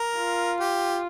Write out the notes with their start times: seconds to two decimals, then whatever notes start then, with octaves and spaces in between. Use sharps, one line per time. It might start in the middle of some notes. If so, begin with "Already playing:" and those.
Already playing: A#4
0.16 F4
0.60 G4